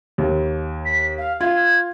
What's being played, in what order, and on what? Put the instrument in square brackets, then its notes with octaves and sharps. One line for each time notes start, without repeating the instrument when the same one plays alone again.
[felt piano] D#2
[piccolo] B6
F5
[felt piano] F4 [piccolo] G#6